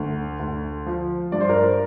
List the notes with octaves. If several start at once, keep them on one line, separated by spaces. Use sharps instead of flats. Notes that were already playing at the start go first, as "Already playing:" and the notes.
Already playing: D2
D2
F3
G2 D5
C5
A#4 D5